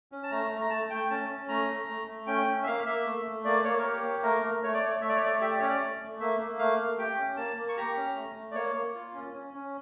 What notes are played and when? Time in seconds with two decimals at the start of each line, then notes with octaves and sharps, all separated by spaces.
0.12 C#4
0.23 A5
0.31 A3 A#5
0.52 A3
0.61 A#5
0.70 A3 A5
0.90 A3 G5
1.10 C#4 A5
1.29 C#4
1.48 A3 A#5
1.69 A3
1.88 A3
2.08 A3
2.27 C#4 G5
2.47 C#4
2.63 E5
2.66 A#3 F5
2.86 A#3 E5
3.06 A3
3.26 A3
3.45 A#3 D5
3.64 A#3 C#5
3.79 G4 A#4
3.93 C#5
4.04 A#3
4.23 A3 A#4
4.43 A3
4.63 A3 C#5
4.74 D5
4.82 A3 C#5
5.02 A3 E5
5.09 D5
5.16 C#5
5.22 A3 D5
5.41 G4 E5
5.50 D5
5.59 C#4 C#5
5.68 D5
5.81 A3
6.00 A3
6.20 A#3 E5
6.40 A#3
6.59 A3 F5
6.79 A3
6.98 G4 G5
7.18 C#4
7.37 A#3 A5
7.57 A#3
7.69 C#6
7.77 G4 A#5
7.97 C#4
8.16 A3
8.35 A3
8.51 D5
8.55 A#3 C#5
8.75 A#3
8.95 F4
9.14 C#4
9.34 C#4
9.54 C#4